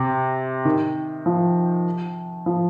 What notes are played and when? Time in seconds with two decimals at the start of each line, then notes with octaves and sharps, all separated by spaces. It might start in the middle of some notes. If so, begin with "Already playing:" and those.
Already playing: C3
0.65 D#3
1.26 F3
2.46 F3